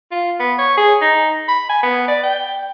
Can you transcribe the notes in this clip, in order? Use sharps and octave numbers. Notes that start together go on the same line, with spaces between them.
F4
B3
C#5
G#4
D#4
B5
G#5
B3
D5
G5